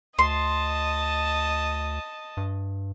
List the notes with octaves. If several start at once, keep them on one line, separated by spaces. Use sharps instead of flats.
D2 D#5 A5 C6
G2